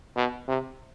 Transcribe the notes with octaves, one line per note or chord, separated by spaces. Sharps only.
B2
C3